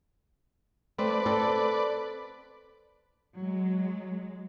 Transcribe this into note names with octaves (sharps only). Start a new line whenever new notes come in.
A3 C4 B4 D5
C4 A4
F#3 G#3